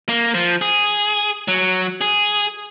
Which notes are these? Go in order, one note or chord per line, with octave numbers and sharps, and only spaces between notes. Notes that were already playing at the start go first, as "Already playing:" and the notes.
A#3
F3
G#4
F#3
G#4